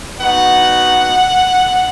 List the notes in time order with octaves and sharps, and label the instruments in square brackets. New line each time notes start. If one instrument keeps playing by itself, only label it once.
[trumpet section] B3 D#4 F#4 F#5